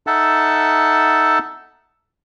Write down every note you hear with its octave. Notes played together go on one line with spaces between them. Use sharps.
D#4 A4 E5 F#5 A5